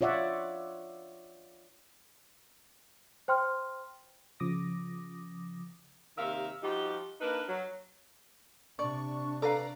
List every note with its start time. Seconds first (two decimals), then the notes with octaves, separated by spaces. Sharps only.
0.01 F4 C#5 D5 E5 F#5
3.28 C5 G5 C6 F6
4.40 C#3 F3 D6 D#6 A#6
6.17 D#2 C3 D#3 A#4 E5 F5
6.62 F3 G3 D#4 F#4 G4
7.21 A#3 D4 D#4 A#4 B4
7.47 F#3
8.79 C3 D4 D5 C#6
9.42 A4 B4 D5 F5 A#5